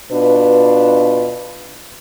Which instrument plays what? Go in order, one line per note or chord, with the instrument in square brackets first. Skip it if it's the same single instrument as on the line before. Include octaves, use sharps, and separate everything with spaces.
[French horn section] B2 D4 F4 B4